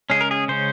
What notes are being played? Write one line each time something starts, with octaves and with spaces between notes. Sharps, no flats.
C#3 G#3 C#4 G#4
A#4
G#4
C#3 G#3 C#4 C5